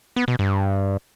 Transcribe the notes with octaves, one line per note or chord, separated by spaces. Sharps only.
B3
B2
G2